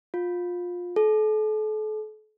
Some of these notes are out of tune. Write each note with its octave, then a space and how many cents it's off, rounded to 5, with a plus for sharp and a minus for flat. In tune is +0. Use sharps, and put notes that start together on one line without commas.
F4 +20
A4 -40